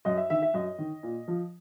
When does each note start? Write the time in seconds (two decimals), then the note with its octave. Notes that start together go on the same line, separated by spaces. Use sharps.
0.05 F#2 D#5
0.17 E5
0.30 D#3 E5
0.42 E5
0.54 F#2 D#5
0.78 D#3
1.03 A#2
1.28 F3